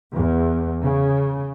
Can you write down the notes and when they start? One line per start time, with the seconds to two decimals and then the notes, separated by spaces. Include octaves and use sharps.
0.13 E2
0.82 C#3